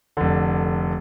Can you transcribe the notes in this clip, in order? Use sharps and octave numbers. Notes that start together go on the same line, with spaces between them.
F1 D3